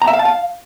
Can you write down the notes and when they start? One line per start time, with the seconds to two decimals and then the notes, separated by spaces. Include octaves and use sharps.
0.02 A#5
0.07 E5
0.13 F5
0.19 A5
0.25 F5